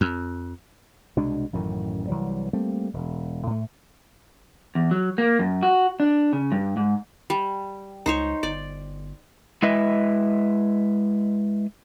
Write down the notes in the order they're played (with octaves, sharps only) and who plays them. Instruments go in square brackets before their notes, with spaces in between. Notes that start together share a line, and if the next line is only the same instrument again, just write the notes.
[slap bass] F2
C2 B2 G#3 D4
A1 F#2 A2 D#3
C2 E3 F#3 G3
G3 A3 A#3 C4
E1
A2 A3
[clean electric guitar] E2
F#3
A#3
F#2
F#4
D4
C#3
G2
G#2
[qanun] G3
[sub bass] C#2 [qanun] D#4 C5 C#5
[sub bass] G1 [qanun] D5
[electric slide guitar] G#3 E4 B4 D#5 E5